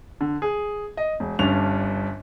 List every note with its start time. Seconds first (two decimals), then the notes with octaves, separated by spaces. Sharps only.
0.21 D3
0.42 G#4
0.97 D#5
1.20 E1
1.39 G1 G2 C#4 D4 F7